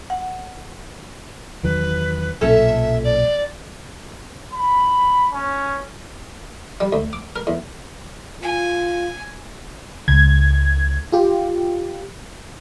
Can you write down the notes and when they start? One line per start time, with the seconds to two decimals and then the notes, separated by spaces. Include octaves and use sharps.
0.10 F#5
1.63 E2 D#3 F#3 B4
2.41 B1 F#2 A#2 C#4 A4 E5
3.04 D5
4.53 B5
5.33 C#4
6.80 G3
6.93 D2
7.13 D6
7.36 A#4
7.47 E2
8.42 F4 G#5
10.08 C#2 G#6
11.12 F4 G4